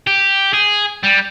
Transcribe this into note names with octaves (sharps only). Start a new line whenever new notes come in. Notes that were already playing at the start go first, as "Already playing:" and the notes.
G4
G#4
G3